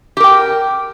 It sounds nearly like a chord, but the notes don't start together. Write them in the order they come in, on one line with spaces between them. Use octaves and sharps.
G4 A#4 G5